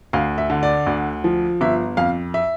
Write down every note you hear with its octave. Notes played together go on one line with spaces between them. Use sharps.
D2 F5
E5
D3
D5
D2
F3
G1 E5
F2 F5
E5